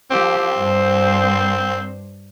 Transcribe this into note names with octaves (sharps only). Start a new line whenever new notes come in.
F3 C4 G4
G2 C5